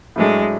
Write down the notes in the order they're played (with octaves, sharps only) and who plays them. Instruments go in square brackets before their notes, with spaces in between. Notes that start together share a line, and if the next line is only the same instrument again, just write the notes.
[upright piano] A2 F#3 A3 D4 [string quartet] G#3